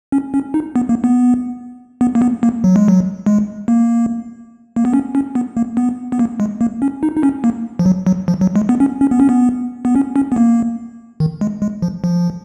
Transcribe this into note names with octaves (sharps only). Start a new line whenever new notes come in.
C#4
C#4
D#4
B3
A#3
B3
B3
A#3
B3
A#3
F#3
G#3
F#3
G#3
A#3
A#3
B3
C#4
C#4
B3
A#3
B3
B3
A#3
G#3
A#3
C#4
D#4
D#4
C#4
A#3
F3
F#3
F#3
F3
F#3
G#3
B3
C#4
C#4
B3
C#4
B3
B3
C#4
C#4
B3
A#3
D#3
G#3
G#3
F3
F3